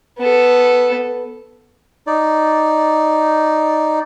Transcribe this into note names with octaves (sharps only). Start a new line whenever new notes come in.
B3 A4
D#4 D5